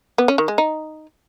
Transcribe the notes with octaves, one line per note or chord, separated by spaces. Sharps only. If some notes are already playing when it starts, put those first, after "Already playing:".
B3
C#4
D#3
G#3
D#4